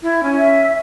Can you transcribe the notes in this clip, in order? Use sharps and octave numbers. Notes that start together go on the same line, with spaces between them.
E4
C#4
E5